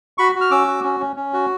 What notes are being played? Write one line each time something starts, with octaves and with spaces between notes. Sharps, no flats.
F#4 B5 C#6
F#4
F6
C#4 D6 E6
F#4
C#4
C#4
C#4
F#4